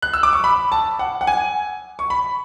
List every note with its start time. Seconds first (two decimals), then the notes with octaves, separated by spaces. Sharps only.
0.02 F#6
0.13 E6
0.23 D6
0.33 C#6
0.44 B5
0.72 A5
0.99 F#5
1.21 F#5
1.27 G#5
1.99 C#6
2.10 B5